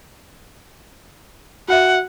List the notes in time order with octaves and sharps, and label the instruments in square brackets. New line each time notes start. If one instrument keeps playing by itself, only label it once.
[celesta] F#4 E5 [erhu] F#5